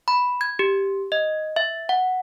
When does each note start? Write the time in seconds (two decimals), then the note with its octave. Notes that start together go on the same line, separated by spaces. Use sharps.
0.08 B5
0.41 G#6
0.59 G4
1.12 D#5
1.56 E5
1.89 F#5